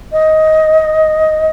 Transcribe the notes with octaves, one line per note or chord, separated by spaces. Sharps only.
D#5